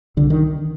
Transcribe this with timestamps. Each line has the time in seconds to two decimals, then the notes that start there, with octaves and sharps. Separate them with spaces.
0.17 C2 D3
0.30 D#3